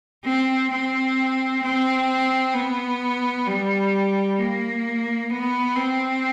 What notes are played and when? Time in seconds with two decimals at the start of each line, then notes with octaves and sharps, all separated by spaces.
0.24 C4
0.71 C4
1.62 C4
2.54 B3
3.46 G3
4.38 A#3
5.30 B3
5.76 C4